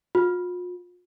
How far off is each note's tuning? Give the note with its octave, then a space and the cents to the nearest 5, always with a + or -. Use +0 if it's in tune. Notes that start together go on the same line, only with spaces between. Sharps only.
F4 +40